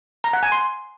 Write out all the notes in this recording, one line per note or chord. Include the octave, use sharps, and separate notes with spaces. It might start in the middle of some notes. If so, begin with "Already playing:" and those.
A#5
F#5
G#5
C6